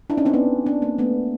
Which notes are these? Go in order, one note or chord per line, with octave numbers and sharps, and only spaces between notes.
D4 E4
C#4 D#4
C4 D4
B3 C#4
C4 D4
A#3 C4
A3 B3